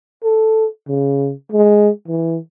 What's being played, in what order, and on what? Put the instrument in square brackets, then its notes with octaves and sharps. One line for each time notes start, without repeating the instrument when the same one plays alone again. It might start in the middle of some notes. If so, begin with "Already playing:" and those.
[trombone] A4
C#3
G#3
E3